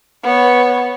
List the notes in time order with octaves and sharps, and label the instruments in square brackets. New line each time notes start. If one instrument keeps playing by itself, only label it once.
[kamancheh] B3 C#5